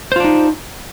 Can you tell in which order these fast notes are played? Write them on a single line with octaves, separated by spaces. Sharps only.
C5 F4 D4 D#4